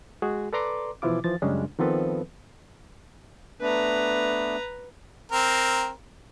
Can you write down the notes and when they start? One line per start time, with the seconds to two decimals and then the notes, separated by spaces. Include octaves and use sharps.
0.22 G#3 F#4 G#4
0.53 A4 B4 D5 A#5 C6 D6
1.02 B2 E3 F3 E4 F4 D6
1.24 E3 F3 A6
1.42 F#2 C#3 G3 G#3 C#4 D4
1.79 D#3 F3 B3 C4 A4 B4
3.61 A3 B3 D4 B4 A#5
5.32 C4 A#4